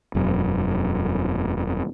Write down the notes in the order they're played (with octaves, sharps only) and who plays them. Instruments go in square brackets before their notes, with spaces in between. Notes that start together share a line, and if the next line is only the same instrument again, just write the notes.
[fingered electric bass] E1 F#2